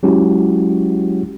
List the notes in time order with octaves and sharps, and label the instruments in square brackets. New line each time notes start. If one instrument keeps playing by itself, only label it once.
[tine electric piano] F#3 G#3 C#4 E4 F#4 G4